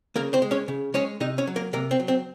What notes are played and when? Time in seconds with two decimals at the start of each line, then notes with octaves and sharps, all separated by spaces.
0.16 C#3 A#3 A#4
0.33 C4 C5
0.42 G#3
0.51 C#4 C#5
0.68 C#3
0.94 G#3 C#4 C#5
1.20 C3 D#4 D#5
1.38 C#4 C#5
1.47 F#3
1.56 A#3 A#4
1.73 C3 A#3 A#4
1.91 C4
2.00 F#3
2.08 C4